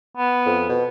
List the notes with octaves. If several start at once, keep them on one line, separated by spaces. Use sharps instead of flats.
B3
F2
B2